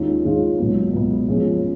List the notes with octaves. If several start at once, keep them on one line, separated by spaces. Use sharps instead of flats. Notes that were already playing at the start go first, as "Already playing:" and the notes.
Already playing: D#2 D#3 G#3 C#4 F4
D#2 D#3 G#3 C#4 F4
C#2 B2 F#3 B3
C#2 B2 F#3 B3
A#2 F3 G#3 C#4